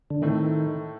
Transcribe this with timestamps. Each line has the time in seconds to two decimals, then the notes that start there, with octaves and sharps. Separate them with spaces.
0.10 D3
0.22 A2 D#3 A3 C4